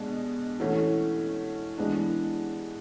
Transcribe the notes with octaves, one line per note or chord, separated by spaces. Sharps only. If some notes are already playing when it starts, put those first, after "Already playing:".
Already playing: B2 G#3 D4
E3 A3 C#4 F#4
E3 G#3 B3 D4